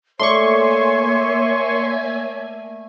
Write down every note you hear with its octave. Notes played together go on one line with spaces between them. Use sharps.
A3 A#3 C#5 D5 E5 G#5 C6 C#6